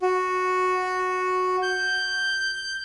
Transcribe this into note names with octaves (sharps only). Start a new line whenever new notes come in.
F#4
G6